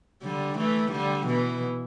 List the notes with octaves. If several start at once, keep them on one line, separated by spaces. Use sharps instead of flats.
D3 G3
E3 A3
D3 G3
B2 E3